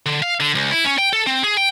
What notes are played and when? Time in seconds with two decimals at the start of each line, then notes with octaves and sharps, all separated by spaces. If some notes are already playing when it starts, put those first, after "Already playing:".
0.06 D3
0.22 F5
0.40 D3
0.55 C#2
0.71 E4
0.85 C#4
0.98 G5
1.13 A4
1.27 C4
1.43 G#4
1.57 G5